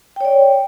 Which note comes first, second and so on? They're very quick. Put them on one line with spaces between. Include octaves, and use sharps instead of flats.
G5 C#5 D5